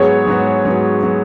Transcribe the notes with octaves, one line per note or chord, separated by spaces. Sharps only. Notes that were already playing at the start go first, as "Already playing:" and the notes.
Already playing: G#2 F#3 B3 F#4 G#4 C#5
G#2 F#3 B3 F#4
G#2 F#3 B3 F#4
F#3 B3 F#4